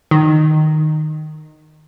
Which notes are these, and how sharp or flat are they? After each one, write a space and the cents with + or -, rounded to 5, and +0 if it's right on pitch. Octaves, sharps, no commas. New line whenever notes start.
D#3 -10